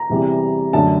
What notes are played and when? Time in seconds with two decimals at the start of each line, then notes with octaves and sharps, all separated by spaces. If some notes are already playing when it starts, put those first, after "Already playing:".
Already playing: A#5
0.10 E2 C3 E3 G3
0.73 F#2 D3 F#3 A3 A5